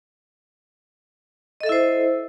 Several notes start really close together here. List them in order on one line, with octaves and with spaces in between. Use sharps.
D#5 A4 E5 E4 C5